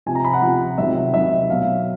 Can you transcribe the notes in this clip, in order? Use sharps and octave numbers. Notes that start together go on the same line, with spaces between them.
C3 F3 G#5
A#5
B5
F#5
C3 F3
C3 D#3 F#3 E5
C3 D#3 F#3 E5
B2 F#3 F5